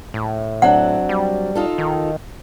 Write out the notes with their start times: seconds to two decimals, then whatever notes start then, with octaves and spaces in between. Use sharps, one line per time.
0.14 A2
0.62 F#3 C4 D4 F#5
1.09 G3
1.55 D#4 F4 A4
1.78 D#3